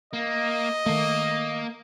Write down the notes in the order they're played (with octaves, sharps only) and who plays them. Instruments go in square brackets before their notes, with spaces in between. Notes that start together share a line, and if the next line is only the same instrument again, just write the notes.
[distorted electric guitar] A#3 [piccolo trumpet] D#5
[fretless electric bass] D#3 A3 [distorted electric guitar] A#3